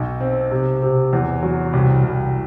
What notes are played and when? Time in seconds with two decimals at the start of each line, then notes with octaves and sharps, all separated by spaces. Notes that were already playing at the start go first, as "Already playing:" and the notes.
Already playing: B1
0.21 C4
0.51 C3
0.82 C3
1.13 E2
1.43 F#3
1.73 C2
2.03 C2